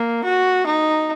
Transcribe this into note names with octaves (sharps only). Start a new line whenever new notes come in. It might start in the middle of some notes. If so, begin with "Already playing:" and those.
Already playing: A#3
F#4
D#4